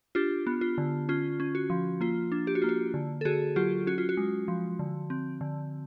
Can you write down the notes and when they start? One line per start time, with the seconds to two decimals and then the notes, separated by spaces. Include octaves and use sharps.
0.15 D4 F4 G4
0.47 B3
0.61 F4
0.78 D3
1.09 C#4 F4
1.40 C#4
1.55 F#4
1.70 F3
2.01 A#3 F4
2.32 D4
2.47 G4
2.55 F#4
2.62 A#3 F4
2.69 F#4
2.94 D3
3.21 A4
3.25 D3 F#4 G#4
3.56 F#3 F4 G4
3.87 C#4 F#4
3.98 F4
4.09 F#4
4.17 G#3
4.48 F3
4.79 D3
5.10 C4
5.41 D3